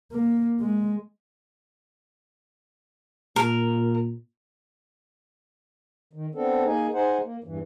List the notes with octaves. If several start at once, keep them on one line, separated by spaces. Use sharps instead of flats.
A#3
G#3
A#2 A#4
D#3
B3 C4 D4 A4
A#3 D#4 G#4
D#4 G#4 C5 F#5
A#3
E2 G2 E3